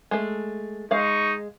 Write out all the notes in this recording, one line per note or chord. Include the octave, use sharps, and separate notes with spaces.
G#3 A3
G#3 D#4 F5 C#6